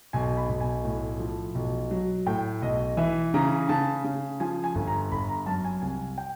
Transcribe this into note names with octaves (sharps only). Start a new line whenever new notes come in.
B1 G#5
B5
B1
G#5
A2
F3
B1
F#3
A2 G5
B1 D#5
E3 E5
C#3 A#5
C#3 A5
C#3
F3 G#5
G#5
G1
A#5
G1 B5
A#5
F#2 A5
G#5
C2 G#5
G5